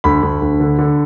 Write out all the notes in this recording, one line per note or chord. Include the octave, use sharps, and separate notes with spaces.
D2 B5
D2
D2
D3
D3